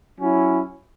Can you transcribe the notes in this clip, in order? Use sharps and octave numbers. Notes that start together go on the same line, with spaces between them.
F#3 C#4 E4